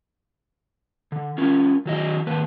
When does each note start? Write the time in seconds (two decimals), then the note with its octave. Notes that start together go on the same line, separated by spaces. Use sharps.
1.12 D3
1.38 C#4 F4 A#4
1.86 D#3 F#3 D#5
2.27 D#3 A#3 B4